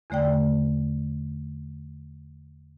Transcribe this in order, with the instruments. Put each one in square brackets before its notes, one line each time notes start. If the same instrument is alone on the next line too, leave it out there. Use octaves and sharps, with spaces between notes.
[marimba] E2 D3 A3 D5 G5